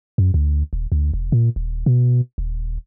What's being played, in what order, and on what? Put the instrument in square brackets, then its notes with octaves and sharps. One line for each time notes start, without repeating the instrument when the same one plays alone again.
[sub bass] F#2
D2
D#1
D2
E1
A#2
D#1
B2
D#1